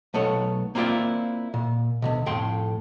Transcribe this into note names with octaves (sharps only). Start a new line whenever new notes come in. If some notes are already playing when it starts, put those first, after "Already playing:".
B1 A3 B3 C#5
A#3 C4 E4 F4 D5
A#2
D2 G#2 B2
F2 A2 G5 C6